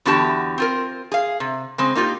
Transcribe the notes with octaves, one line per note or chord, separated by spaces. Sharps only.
E2 D3 B3 F#4 G4 A5
C4 F4 A#4
G#4 F5
C3
C#3 G#3 C4
A#3 D#4 F4 G4